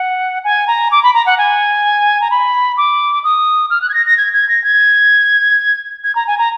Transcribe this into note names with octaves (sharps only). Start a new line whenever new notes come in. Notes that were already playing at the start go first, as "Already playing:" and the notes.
Already playing: F#5
G#5
A#5
D6
B5
A#5
F#5
G#5
A#5
B5
D6
D#6
F6
F#6
G#6
A#6
A#6
G#6
G#6
A#6
G#6
G#6
A#5
G#5
A#5